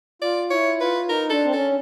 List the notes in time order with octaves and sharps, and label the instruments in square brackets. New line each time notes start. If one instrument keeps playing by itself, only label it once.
[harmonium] F4 [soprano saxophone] D5
[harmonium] E4 [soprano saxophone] C#5
[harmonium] F4 [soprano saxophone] B4
[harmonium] D#4 [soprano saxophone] A#4
[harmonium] D4 [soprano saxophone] A4
[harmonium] C4
[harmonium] C#4 [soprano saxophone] A4